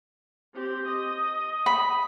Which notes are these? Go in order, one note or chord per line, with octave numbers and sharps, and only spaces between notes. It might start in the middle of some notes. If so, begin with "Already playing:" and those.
C4 G4
D#5
B5